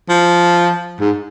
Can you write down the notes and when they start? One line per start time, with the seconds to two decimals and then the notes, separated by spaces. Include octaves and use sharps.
0.09 F3
1.00 G#2